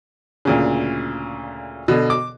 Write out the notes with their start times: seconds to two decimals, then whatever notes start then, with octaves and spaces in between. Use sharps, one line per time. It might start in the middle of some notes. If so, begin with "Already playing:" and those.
0.45 D2 A#2 C#3
1.88 B2 D3
2.10 D6